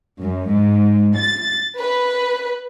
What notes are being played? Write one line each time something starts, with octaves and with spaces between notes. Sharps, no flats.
F#2
G#2
A6
B4